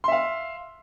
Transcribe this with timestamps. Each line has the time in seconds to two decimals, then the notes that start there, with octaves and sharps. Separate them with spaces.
0.04 C6
0.08 E5
0.12 F5